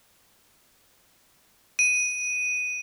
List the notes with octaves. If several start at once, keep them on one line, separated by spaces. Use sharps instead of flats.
D#7